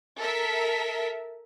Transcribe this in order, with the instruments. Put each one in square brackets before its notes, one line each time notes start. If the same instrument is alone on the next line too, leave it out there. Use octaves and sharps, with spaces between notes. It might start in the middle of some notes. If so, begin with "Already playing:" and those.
[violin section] A4 A#4 E5 B6